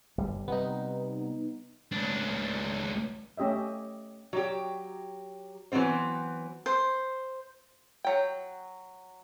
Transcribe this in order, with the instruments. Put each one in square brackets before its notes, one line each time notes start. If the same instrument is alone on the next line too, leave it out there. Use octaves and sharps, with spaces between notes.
[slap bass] G1 G3
[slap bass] C3 G3 [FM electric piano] B3 D#4
[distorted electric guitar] C#2 D4
[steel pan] A3 C#4 G4 D#5 E5
[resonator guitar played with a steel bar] F#3 G4
E3 F#3 B3 C4 C5
[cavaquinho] C5
[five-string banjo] F#3 G5